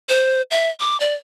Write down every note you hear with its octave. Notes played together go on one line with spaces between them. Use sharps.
C5
E5
D6
D5